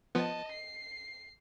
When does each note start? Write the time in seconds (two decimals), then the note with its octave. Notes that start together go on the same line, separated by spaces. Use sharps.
0.15 F3 B3 D#5 A5
0.51 C7